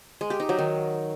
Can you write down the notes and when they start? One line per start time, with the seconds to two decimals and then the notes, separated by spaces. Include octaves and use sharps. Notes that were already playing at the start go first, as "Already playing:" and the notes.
0.21 G#3
0.30 G4
0.40 D#4
0.49 F#3
0.58 D#3